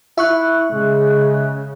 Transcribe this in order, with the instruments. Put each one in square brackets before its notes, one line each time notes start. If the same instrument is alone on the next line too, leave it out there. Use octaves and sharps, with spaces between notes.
[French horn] E4 [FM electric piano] E5 C#6 F#6
[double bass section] C#3 [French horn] G#3